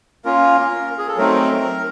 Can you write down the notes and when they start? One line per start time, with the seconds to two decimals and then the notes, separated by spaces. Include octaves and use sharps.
0.25 A#3 C#4 F4 A#4
0.98 G#4
1.08 A4
1.17 F#3 A3 C4 D#4 A#4